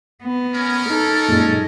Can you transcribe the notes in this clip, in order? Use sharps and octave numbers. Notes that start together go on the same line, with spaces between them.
B3
C#4 A#4
D#4 A4
F#2 A#2 G#3